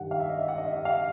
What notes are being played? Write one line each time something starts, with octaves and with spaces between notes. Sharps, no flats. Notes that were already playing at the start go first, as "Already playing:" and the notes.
Already playing: G2 D#3 G3 F#5
F5
E5
D#5
E5
F#5
D#5
E5
F#5
F5